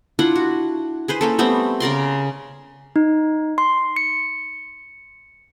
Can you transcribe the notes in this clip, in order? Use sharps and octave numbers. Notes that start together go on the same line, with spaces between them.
D4 E4 F4 F#5
F#4
G#4 B4 C5
A#3 C#4 A4
G3 A3 B3 C4
C#3 A#4 D5 C6
D#4
C6
C#7